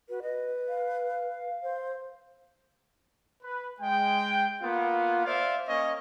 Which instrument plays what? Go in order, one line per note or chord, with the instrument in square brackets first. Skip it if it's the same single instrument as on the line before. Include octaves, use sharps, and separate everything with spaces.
[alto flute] F#4 [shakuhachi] B4
[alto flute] B4 [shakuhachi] D#5
[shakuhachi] F5
[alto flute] C5
[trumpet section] B4
G#3 G5
A#3 B3 F4
C5 D5 E5 F5
A#3 C#4 C#5 D#5